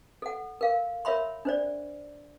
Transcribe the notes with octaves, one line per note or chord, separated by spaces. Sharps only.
A4 F#5
A#4 F5
A#4 C#5 E5 B5 C6
D4 C5 D5